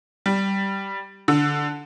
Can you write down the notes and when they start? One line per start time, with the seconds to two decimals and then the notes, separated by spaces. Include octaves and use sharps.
0.26 G3
1.28 D3